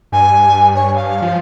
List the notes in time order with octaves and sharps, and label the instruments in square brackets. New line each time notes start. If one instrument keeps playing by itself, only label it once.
[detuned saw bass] G2 [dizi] G#5
[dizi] C#5
F5
[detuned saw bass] F3